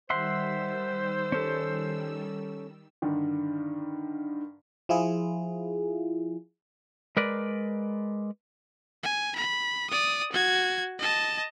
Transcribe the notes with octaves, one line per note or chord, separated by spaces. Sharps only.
D#3 G3 C5 E5 F#5 C6 E6
C#4 A4
G2 D3 D#3
F3 E4 F4 G#4
G#3 A#4 B4 D5
G#5
B5
D5 D#6
F#4 G#6
D#5 A5